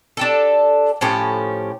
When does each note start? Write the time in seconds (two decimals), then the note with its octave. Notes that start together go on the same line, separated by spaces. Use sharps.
0.17 D4 G4 A4
1.01 A2 F3 C#4 G4